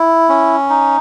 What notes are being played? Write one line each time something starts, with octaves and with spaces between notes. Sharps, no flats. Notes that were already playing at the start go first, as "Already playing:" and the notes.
Already playing: E4
C#4
D#4